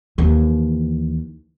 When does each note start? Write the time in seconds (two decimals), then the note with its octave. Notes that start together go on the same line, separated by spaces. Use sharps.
0.18 D#2 E3